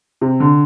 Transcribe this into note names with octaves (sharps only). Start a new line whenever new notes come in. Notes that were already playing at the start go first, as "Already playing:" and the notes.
C3
D3